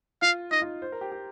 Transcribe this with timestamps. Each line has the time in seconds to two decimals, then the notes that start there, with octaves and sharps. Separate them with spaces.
0.22 F4 F5
0.51 D#4 D#5
0.62 F4
0.82 C5
0.92 A#4
1.01 G4
1.12 G4